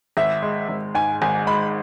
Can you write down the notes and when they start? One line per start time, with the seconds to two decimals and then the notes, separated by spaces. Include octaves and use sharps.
0.17 G#1 E5
0.42 G#3
0.69 G#1
0.95 G#2 G#5
1.22 G#1 G#5
1.47 G#3 B5